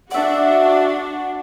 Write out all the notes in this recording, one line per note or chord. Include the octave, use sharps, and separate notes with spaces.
D4 F#4 D5 E5 F#5